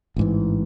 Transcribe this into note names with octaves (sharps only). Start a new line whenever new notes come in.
A1 G#2 E3